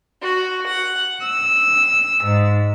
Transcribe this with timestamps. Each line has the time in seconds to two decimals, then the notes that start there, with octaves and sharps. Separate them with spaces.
0.22 F#4
0.67 F#5
1.21 E6
2.24 G#2